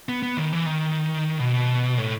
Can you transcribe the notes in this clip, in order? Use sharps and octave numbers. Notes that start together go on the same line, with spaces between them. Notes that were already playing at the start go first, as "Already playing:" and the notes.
B3
B3
D#3
E3
D#3
B2
A2